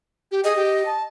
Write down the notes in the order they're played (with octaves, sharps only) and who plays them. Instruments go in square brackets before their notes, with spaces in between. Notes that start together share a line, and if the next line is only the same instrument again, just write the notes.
[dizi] G4
[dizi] G#4 [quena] D#5
[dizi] G4
A5